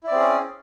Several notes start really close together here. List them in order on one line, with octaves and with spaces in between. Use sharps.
E4 D5 C4 G#4 C#4